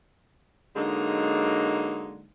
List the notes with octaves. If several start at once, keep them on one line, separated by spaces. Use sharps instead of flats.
D3 F#3 G#3 A#3 D#4